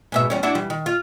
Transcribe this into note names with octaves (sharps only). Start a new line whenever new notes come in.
G#2 B2 E5
E2 G3 C#4
D4 E4 F#4
E3 G3
D#3
F4